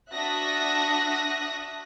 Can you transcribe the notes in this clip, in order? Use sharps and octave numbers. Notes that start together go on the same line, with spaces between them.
D4 F#4 E5 D#6 F#6 A#6